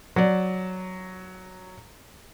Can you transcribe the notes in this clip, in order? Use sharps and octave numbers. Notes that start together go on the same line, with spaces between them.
F#3 D5